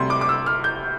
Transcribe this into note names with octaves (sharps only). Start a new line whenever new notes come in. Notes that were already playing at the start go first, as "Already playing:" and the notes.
Already playing: D2 C3 G3 C6
D6
D6
E6
F6
G6